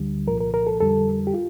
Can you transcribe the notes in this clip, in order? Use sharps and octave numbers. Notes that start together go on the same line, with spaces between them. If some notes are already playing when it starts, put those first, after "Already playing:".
Already playing: D2 D3 G3
C2 A#2 F3 A#4
A#4
A#4
A4
F2 D3 G3 A4
G4
F4